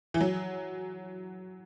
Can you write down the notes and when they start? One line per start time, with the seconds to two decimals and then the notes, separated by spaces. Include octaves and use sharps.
0.14 E3
0.21 F#3